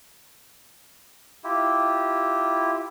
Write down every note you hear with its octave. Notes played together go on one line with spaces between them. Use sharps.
E4 F4 G4